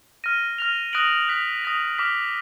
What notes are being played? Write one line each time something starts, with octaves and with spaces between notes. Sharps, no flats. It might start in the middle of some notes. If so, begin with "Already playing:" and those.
F6 A#6 D#7
F6 A#6 F7
D#6 F#6 A#6 D7 F#7
F#6 B6 F7
D#6 A#6 F7
D6 F6 B6